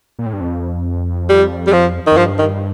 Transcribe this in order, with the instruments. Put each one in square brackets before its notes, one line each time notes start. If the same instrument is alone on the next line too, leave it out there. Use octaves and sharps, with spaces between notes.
[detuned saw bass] A#2
A2
G2
F2
[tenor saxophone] G3
G3
F3
[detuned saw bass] F2 [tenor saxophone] D#3
[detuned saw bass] G2 [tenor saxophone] F3
[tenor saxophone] D#3